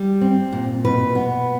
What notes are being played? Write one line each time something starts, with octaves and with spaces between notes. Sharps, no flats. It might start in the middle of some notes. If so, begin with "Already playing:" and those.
Already playing: G3
C4
A#2
B2 B4
B3